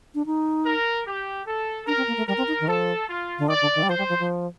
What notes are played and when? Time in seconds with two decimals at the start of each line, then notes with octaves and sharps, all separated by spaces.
0.15 D4
0.26 D#4
0.65 A#4
1.06 G4
1.46 A4
1.87 D4 A#4
1.97 C4
2.08 A#3
2.17 A3
2.27 G3 A#4
2.38 C4
2.48 D#4
2.60 D#3
2.68 F3 A4
3.08 F4
3.39 D3
3.48 D#3 D5
3.62 D3
3.75 D#3
3.83 G3
3.89 F3 C5
3.98 G3
4.09 F3
4.20 F3